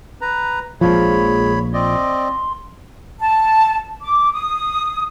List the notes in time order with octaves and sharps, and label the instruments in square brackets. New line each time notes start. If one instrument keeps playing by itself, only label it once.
[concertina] B4 A#5
[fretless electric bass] A#1 A#2 F3 [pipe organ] G#3 G#4 [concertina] C#5 B5
[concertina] C4 D5 D#5 [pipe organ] C6
[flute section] A5
D6
D#6